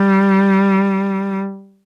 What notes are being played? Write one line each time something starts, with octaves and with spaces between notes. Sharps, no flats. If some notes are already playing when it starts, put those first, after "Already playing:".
Already playing: G3